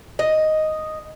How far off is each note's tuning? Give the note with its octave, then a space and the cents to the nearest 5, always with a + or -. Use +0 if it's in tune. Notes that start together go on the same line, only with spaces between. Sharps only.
D#5 +0